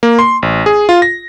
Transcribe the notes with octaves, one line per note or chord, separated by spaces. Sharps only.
A#3
C6
A1
G#4
F4
A#6